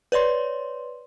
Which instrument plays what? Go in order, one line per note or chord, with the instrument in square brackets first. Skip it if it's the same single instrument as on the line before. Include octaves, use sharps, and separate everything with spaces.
[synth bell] B4 C#5 D5 C6